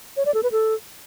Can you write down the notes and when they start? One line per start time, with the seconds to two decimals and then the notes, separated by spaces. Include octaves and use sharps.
0.17 C#5
0.26 D5
0.34 A4
0.43 B4
0.52 A4